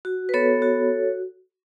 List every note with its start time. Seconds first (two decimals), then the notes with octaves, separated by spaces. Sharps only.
0.05 F#4
0.29 B4
0.34 B3 A4 C#5
0.62 F#4